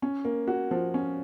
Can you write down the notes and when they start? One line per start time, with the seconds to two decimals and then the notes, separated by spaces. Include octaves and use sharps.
0.02 C#4
0.25 A#3
0.48 F#4
0.71 F3
0.94 C#4